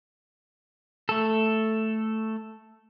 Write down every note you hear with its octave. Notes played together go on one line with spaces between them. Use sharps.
A3 A4